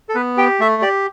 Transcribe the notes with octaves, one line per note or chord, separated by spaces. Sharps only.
A4
B3 B4
G4 G5
A3 E5
G4 D5